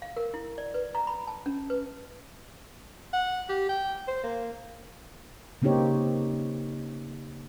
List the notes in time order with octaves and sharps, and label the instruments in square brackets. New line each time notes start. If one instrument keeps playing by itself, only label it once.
[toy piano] F5
A#4
E4
D5
B4
A#5
B5
A5
C#4
B4
[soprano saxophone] F#5
G4
G5
C5
A#3
[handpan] C#3 A#3 C4 D#4 G4 C#5